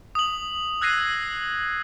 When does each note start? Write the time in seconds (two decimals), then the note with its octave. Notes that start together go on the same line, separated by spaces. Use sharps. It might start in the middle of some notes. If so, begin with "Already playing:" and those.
0.15 D#6 F#7
0.81 E6 F#6 G#6 A#6 C7 D#7